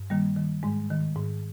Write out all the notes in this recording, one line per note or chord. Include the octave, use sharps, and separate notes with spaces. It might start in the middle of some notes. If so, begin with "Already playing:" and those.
Already playing: G2
D#3 G3 A#3
D#3
G#2 G#3
D#3
G#2